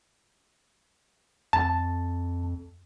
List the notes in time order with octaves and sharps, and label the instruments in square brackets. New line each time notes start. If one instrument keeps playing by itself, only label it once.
[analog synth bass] F2 [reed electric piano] A5